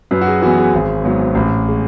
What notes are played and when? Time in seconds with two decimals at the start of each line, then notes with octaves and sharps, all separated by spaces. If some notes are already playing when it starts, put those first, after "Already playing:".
0.11 F#2 B4
0.21 F#4
0.26 G#4
0.42 E3 B3 F#4
0.57 G#4
0.73 G#1
1.04 G#2 F#3 B3
1.35 A1
1.68 G#3